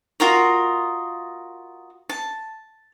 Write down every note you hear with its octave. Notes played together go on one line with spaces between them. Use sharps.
F4 F#4 A#4 D#5
A5